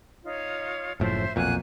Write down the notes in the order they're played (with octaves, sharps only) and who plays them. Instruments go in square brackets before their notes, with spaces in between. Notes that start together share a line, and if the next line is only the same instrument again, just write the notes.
[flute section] D#4 F4 C#5
[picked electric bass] F#1 A2 F3 [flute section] C5 E5
[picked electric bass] B1 F2 A#2 [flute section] F#5 G#5 F#6